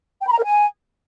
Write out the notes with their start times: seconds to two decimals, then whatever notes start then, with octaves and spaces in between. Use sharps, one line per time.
0.21 G5
0.27 B5
0.33 A#5
0.38 A#4
0.44 G#5